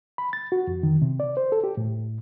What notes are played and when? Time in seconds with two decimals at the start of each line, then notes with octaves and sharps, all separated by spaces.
0.18 B5
0.33 A6
0.52 F#4
0.67 F2
0.83 D#3
1.02 C3
1.20 D5
1.37 C5
1.52 A4
1.64 G4
1.77 A2